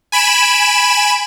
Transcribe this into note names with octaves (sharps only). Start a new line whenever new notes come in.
G#5 B5 D7 E7